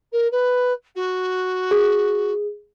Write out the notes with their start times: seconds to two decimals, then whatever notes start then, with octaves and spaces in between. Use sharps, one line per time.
0.12 A#4
0.31 B4
0.95 F#4
1.71 G#4